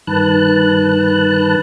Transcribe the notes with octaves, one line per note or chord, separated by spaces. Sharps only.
G2 D#3 B4 A5 F#6